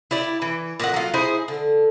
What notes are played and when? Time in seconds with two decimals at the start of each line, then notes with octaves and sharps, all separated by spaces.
0.11 E4 G4 D5
0.42 E3
0.80 A#2 D#5 F#5
0.94 F#3 F4
1.14 D#4 E4 G#4 C5
1.48 D3